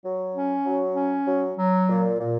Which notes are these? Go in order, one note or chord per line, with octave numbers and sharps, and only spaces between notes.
F#3
C#4
F#3
C#4
F#3
F#3
A#2
A#2